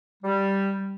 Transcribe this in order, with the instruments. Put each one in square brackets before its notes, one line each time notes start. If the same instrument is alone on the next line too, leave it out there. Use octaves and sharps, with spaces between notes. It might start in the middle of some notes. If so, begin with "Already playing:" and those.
[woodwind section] G3